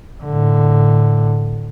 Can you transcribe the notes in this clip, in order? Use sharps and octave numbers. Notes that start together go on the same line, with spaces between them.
A2 D3